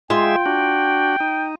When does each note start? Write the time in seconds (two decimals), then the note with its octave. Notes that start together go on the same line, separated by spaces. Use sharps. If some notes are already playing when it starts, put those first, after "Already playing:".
0.10 G#3 F4 G#4 E5 G5
0.46 D4 F#4
1.20 D#4